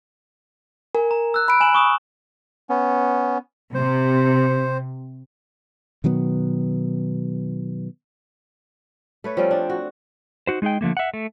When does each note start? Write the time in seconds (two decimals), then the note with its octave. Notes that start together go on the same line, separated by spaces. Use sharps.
0.95 A#4 G#5
1.11 A#5
1.34 E6 F#6
1.48 B5 D7
1.60 G#5 E7 F#7
1.74 C#6 D#6 E7
2.70 B3 C#4
3.75 C3 C5
6.04 B2 D#3 F#3 B3
9.24 A3 B4 C#5
9.37 F3 G3 C4 C#4
9.51 D4
9.69 F#4
10.47 D#4 F#4 C5
10.62 G#3 D#4 G#4 D#5 G5
10.81 D3 F3 A3 A#3
10.97 E5 F#5
11.14 A3